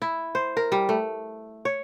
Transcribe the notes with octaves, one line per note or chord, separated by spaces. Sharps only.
E4
C5
A#4
G3
A3
C#5